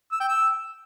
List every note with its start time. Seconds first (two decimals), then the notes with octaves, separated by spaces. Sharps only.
0.12 E6
0.20 G5
0.29 E6